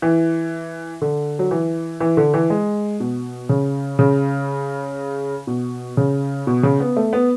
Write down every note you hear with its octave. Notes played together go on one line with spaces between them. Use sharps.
E3
D3
F#3
E3
E3
D3
E3
G#3
B2
C#3
C#3
B2
C#3
B2
C#3
B3
A3
B3